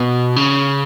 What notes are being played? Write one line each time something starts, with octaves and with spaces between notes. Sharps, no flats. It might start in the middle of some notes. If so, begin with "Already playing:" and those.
Already playing: B2
C#3